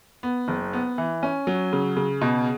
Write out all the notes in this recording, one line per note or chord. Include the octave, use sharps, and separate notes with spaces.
B3
F#1
B3
E3
C#4
F#3
C#3
C#3
B2